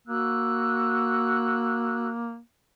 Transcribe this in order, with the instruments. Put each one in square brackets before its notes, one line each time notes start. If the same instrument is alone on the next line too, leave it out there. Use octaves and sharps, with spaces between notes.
[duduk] A#3 [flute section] F#4 E6 F#6